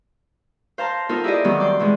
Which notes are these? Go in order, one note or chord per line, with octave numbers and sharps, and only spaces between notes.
C5 F5 A5 A#5 C6
B3 D#4 F4 A4 A#4 C5
E4 G4 G#4 D5 D#5
D#3 F#3 G3 B3 C4
D5 G5 C6
B2 E3 G#3 G#4